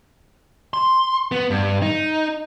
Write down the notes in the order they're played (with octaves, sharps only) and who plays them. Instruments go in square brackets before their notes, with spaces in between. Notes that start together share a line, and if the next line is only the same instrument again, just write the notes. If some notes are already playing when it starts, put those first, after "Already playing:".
[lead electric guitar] C6
B3
G2
D#4